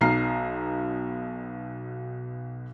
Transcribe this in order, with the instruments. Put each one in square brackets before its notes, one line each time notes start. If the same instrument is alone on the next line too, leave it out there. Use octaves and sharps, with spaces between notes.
[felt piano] B1 B2 A#5 F6 C7